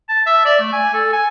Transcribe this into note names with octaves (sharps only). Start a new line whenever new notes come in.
A5
E5
D5
A3
G#5
A4
G#5